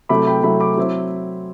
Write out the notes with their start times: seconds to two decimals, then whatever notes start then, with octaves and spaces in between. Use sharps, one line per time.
0.09 C3 F#3 A3 E4 B5 D6
0.27 G5 B5
0.43 C3 F#3 A3 E4 G5 B5
0.60 B5 D6
0.77 F#3 C4 E4